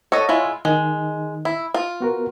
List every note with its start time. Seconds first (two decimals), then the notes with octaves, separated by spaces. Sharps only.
0.12 A4 C#5 D#5 F#5 C#6
0.29 G#3 E4 F4
0.65 D#3 G#3 D#4
1.45 E4
1.74 F4
2.00 B3 F#4 A#4